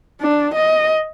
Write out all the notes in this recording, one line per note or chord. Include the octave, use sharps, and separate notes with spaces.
D4
D#5